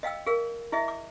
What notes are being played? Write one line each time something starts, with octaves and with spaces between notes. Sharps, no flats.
D#5 F5 G5 E6
G#4 A#4 F5 E6
E4 G#4 D#5 E5
D6